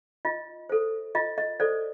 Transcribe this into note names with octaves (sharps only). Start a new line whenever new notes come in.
F4 D#5
A4 C5
F4 D#5
D#5
A4 C5 D5